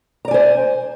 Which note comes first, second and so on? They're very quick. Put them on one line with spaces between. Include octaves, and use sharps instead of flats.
A#5 D5 G#5 C5